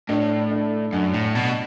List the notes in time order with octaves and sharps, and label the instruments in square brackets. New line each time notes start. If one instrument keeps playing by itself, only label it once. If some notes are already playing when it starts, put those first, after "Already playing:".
[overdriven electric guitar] A2 [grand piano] D4
[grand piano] D4
[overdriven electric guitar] F#2 [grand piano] D4
[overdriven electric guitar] A2
B2